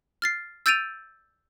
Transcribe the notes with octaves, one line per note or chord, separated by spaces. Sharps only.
F6 A6 C7
E6 G6 A6 D7 D#7 F7